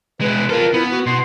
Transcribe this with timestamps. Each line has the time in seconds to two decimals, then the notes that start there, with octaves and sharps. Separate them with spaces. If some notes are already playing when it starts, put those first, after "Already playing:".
0.21 B2 G#3 B4
0.49 F4 A4 A#4
0.74 B3 E4
0.92 F#4
1.06 B2 C6